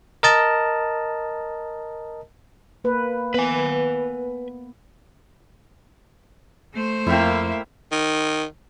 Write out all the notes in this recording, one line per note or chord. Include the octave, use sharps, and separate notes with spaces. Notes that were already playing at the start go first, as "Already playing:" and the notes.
A#4 D#5 A5
A#3 B4
B3 B4 G#5
A3 C5
F2 A#3 E4 E5 F5 G5
D#3